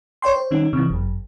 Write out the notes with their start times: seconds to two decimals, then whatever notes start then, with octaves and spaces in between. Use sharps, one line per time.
0.22 C#5 D5 G5 C6
0.36 C5
0.51 D#3 G3 C#4 D#4
0.73 C3 E3
0.90 G1 F#2